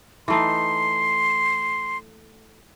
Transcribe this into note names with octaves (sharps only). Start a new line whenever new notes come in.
E3 A3 D#4 C6